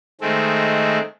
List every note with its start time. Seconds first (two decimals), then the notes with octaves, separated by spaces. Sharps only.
0.21 D#3 G#3 A3 C4